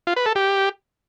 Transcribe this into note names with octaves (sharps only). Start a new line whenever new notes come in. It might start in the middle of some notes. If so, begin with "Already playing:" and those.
F4
B4
A4
G4